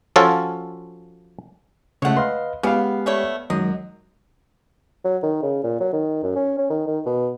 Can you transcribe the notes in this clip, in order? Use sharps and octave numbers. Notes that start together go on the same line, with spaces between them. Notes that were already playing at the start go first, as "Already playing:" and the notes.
F3 C#4 F4 F#4 A4 C#5
C#3 G#3 A3 C#5 F#5
B4 D#5 F5 C6
C#3 G#3 B3 G4 F5 F#5
G3 A3 C#5
F#2 D#3 F#3 G#3 D#5
F#3
D#3
C#3
A#2
F#3
D#3
F#2
C#4
C#4
D#3
D#3
B2